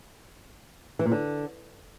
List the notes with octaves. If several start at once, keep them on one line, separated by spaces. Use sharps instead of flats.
E3
A#2
D3